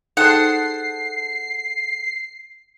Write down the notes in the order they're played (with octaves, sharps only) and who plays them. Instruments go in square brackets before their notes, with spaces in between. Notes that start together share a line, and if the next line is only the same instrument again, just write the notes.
[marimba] D#4 G5 [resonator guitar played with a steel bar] G#4 A4 C5 [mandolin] F#5 [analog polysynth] C7